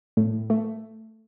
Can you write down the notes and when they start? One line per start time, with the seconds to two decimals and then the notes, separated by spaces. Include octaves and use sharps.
0.17 A2
0.50 A3